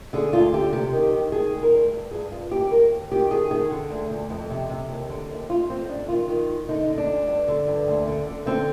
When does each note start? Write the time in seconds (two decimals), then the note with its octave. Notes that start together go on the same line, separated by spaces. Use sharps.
0.13 D3 G#4
0.33 D2 F4
0.53 D3 G4
0.72 C3 G4
0.93 D#3
1.13 D#3
1.32 D#3 G#4
1.53 D2
1.63 A#4
1.73 D2
1.93 G2
2.11 G2 G#4
2.32 G2 F4
2.52 D#2 G4
2.71 D#2 A#4
2.91 D#2
3.12 D#3 G4
3.31 D#3 G#4
3.51 D#3 G#4
3.71 D3
3.90 D2
4.10 D2
4.30 F2
4.50 C3
4.69 C3
4.90 D#2
5.09 D3
5.30 D#2
5.49 F2 F4
5.69 F2 C4
5.89 F2 D4
6.08 D#3 F4
6.28 D#3
6.49 F2
6.69 D3 D#4
6.88 D3
6.98 D4
7.09 D2
7.27 G2
7.48 D3
7.68 G2
7.88 D2
8.08 D3
8.27 D3
8.46 D3 C4